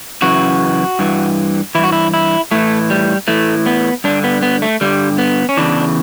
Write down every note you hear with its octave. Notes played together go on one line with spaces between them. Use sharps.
F#2 C#3 E3 F#4
G2 E3
G2 E3 E4
F#4
E4
E4
A2 E3 A3
G3
A2 E3 A3
B3
G2 D3 D4
B3
B3
A3
G2 D3 G3
B3
C#4
E2 C#3 E3 D4